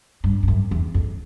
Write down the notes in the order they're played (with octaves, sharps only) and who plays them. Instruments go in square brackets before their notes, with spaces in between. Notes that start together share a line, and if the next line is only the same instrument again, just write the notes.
[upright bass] G2
G2
F#2
E2
F2